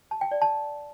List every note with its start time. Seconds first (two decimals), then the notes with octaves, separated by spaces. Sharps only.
0.11 A5
0.21 G5
0.31 D5
0.42 A5